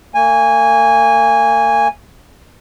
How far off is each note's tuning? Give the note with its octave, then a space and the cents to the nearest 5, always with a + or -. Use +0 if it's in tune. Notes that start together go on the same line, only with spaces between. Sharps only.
A#3 -40 G#5 -15